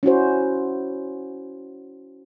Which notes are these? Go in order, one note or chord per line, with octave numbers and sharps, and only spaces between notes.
C#4 E4 F#4 C5